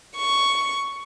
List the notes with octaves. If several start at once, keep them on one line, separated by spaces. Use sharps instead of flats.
C#6